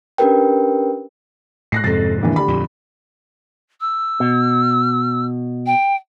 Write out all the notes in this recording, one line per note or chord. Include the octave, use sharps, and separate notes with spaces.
C#4 D4 G4 A#4 B4 G5
A2 F#6 A#6 C7
F2 G#2 C3 F3 A6
A#1 D#2 E3
D2 D3 G4 B5
F2 A#2
E6
B2
G5